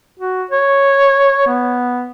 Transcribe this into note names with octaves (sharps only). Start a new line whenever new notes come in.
F#4
C#5
B3